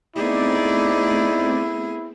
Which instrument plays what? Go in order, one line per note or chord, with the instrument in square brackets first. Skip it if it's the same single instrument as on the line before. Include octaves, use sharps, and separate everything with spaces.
[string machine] A3 C4 [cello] B3 G#4 [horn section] D#4 D5 [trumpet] E4